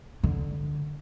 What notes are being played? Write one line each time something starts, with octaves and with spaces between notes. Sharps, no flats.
D3